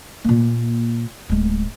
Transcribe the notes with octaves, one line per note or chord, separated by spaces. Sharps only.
A#2 A#3
D1 G#3